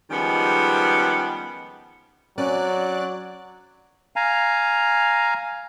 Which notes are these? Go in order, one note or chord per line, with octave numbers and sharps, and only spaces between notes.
D#3 F3 G3 G#3 B3 C#4
F#3 C4 C#4 D5 F#6
F5 G#5 A#5